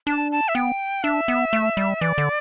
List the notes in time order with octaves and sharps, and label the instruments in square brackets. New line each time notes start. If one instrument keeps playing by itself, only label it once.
[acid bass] D4 [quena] A5
[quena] A5
E5
[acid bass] B3 [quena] G5
[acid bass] D4 [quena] E5
[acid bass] B3
A3
G3
[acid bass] E3 [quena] D5
[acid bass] D3